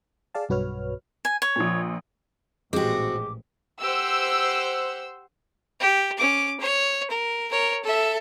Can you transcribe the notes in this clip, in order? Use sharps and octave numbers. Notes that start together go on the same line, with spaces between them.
G#4 D5 F5 A5
B1 G2 F#4 B4 C#5 F6
G#5
C#5
A#1 A#2
A1 A#2 F3 G#3 C4 F#4 G4 D6
G4 C5 F#5 E6
G4
C#4 D6
C#5
A#4
A#4 C#5
A4 E5